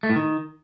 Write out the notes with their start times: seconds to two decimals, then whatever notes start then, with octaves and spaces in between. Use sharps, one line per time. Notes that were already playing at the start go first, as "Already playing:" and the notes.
0.03 A3
0.10 A2
0.16 D#3